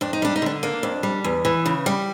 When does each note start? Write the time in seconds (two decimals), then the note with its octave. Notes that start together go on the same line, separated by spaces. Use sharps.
0.01 F2 D4
0.13 D#4
0.22 G3 D4
0.36 D#4
0.42 D3 D4
0.63 A#3 D4
0.83 F2
1.03 G3
1.24 E2
1.45 E3
1.66 C#3
1.86 G3